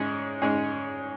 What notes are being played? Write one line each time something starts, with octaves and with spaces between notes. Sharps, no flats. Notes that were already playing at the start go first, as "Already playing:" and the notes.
Already playing: G#2 G#3 C#4 G#4
G#2 G#3 C#4 G#4